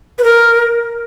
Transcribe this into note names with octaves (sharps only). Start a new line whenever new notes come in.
B4
A#4